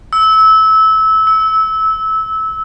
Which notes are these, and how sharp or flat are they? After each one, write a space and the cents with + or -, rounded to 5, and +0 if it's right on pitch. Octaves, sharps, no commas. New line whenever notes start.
E6 -20
E6 -15